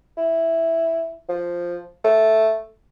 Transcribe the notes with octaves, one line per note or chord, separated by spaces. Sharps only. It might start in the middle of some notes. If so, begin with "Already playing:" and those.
E4
F3
A3